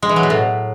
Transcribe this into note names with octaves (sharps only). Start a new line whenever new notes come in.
G#3
E3
F#3
B2
A2